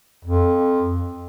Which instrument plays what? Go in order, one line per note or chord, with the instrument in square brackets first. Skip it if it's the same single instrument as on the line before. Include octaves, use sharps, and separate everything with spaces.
[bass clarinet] F2